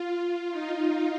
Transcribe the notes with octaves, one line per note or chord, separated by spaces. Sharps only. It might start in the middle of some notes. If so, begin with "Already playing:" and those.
Already playing: F4
F4
D#4